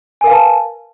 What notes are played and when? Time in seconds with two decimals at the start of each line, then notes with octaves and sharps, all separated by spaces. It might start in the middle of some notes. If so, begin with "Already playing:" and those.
0.21 G#5
0.24 A#4
0.27 F5
0.30 B4
0.33 A5